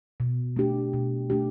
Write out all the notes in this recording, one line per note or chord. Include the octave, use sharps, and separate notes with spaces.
B2
A3 D4 G4
B2
A3 D4 G4